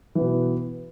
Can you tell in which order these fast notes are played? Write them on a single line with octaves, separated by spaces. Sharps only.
E3 B3 B2